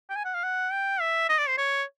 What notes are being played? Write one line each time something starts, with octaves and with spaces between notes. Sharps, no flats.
G5
G#5
F#5
F5
F#5
G5
E5
D#5
D5
C5
C#5